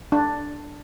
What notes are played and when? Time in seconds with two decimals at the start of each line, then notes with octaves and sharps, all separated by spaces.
0.12 D4